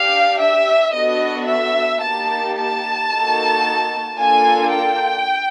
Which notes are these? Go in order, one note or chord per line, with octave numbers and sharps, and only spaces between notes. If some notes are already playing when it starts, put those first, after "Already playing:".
Already playing: D4 G4 F5
E5
B3 D4 F#4 A4 D#5
E5
A#3 D#4 G4 A5
A5
A#3 D#4 F#4 A4
A#3 D4 F4 A4 G#5
G5